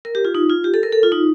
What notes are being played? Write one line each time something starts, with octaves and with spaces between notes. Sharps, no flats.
A#4
G4
F4
D#4
F4
G4
A4
A#4
A4
F4
D#4